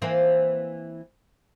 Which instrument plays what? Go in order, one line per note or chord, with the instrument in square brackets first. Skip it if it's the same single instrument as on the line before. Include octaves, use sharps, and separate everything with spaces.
[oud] E3 A#3 C4